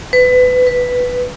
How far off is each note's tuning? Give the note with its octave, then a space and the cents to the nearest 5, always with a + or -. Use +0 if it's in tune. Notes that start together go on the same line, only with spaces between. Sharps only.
B4 +25
B4 +0